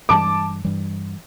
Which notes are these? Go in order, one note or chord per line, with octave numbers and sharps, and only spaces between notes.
G2 E3 G3 A5 D6
G2 E3 G3